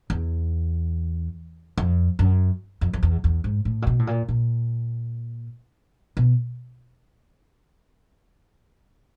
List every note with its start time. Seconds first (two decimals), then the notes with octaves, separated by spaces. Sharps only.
0.10 E2
1.78 F2
2.19 F#2
2.81 F2
2.93 F2
3.03 E2
3.24 E2
3.44 G#2
3.65 A2
3.82 A#2
3.87 B2
3.99 A2
4.07 A#2
4.28 A#2
6.17 B2